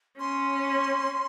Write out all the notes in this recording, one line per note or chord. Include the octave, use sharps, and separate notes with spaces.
C#4 C6